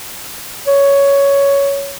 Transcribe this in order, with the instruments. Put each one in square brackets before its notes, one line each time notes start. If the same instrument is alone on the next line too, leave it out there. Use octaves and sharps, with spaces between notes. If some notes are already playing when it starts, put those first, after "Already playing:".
[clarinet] C#5